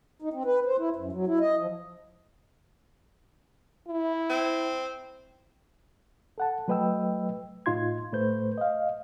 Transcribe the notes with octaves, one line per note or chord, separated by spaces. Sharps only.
D#4
C4
B4
C5
E4
F#2
F#3
E4
D#5
F3
E4
C4
A4 F#5 A5
F#3 A3 B4 D#5 G5 E6
A2 D#4 F4 C6 G#6
A2 A3 B4 C5 G6
D#5 F5